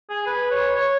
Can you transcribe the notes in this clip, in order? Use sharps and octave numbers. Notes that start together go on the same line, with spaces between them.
G#4
B4
C#5
C#5